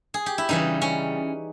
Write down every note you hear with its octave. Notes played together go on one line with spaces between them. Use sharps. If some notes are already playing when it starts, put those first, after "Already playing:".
G#4
G4
E4
C#3 E3 G3 D#4
C#4